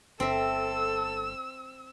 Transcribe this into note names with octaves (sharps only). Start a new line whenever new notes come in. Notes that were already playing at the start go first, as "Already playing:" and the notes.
G1 C4 A4 E5 E6